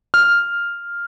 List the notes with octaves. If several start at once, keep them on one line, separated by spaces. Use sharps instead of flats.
F6